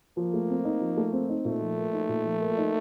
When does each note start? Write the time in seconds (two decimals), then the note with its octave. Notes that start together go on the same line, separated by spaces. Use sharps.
0.17 F3 A#3
0.34 A3
0.50 C4
0.65 D#4
0.81 F3
0.97 A3
1.13 C4
1.29 D#4
1.45 A#2 A3
1.61 F3
1.78 A#3
1.93 D#4
2.09 A#2
2.25 F3
2.41 A#3
2.58 D#4